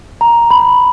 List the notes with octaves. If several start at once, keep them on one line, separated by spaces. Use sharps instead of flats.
A#5
B5